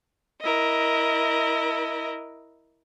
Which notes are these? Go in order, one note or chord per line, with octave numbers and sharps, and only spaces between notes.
E4 A#4 D#5